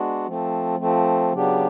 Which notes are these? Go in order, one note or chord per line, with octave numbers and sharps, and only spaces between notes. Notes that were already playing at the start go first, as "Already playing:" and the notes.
Already playing: G#3 B3 D4 F#4
F3 A3 C4
F3 A3 C4
C#3 F#3 B3 D4 G4